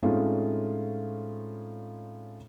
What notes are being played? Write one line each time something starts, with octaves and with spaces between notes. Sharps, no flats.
A2 G#3 C4 C#4 D#4 F4